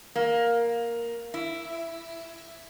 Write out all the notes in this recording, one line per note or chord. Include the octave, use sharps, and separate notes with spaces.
A#3
E4